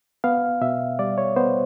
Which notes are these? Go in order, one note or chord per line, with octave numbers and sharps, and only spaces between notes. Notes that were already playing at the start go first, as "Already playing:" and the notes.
B3 F5
B2 E5
G3 D5
C#5
B3 C5